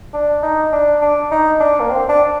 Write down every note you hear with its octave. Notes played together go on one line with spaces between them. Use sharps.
D4
D#4
D4
D4
D#4
D4
A#3
C4
D4